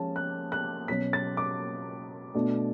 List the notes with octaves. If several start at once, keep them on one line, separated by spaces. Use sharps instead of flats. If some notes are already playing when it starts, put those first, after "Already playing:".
Already playing: F3 G#3 C#4 A5
F#6
F#6
B2 F#3 C#4 B6
A6
D6
B2 A3 D4